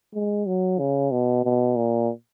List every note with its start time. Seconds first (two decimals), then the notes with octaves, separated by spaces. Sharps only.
0.14 G#3
0.46 F#3
0.79 C#3
1.11 B2
1.44 B2
1.76 A#2